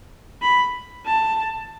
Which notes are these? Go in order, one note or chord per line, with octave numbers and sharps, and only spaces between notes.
B5
A5